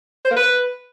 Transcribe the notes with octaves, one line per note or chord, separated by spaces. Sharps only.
C5
A#3
B4